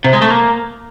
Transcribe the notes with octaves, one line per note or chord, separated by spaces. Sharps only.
C3
G#3
A3
A#3